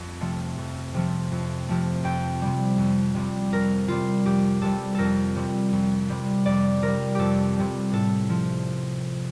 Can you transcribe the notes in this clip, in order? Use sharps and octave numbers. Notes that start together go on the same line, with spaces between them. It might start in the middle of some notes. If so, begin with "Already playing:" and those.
Already playing: F2
C3 F3 A3
F2
C3 F3 A3
F2
C3 F3 A3
F2 G5
C3 G3
F2
C3 G3
F2 A#4
C3 G3 F4
F2 G4
C3 G3 A4
F2 A4 A#4
C3 G3
F2
C3 G3
F2 D5
C3 A#4
G3
F2 G4 A4
C3 G3
A2 A4
F3